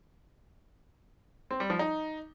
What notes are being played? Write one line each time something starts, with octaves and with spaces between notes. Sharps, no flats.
C4
G3
F3
D#4